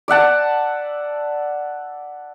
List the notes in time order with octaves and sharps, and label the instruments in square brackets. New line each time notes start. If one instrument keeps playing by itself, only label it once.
[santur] D5 E5 F#5 A5